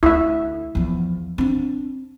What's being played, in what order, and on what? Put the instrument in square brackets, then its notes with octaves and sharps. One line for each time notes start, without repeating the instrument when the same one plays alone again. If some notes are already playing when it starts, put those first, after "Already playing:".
[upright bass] D2 [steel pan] E4 E5
[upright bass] E2 F3
C4 D4